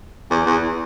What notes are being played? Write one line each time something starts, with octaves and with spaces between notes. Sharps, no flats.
E2
E2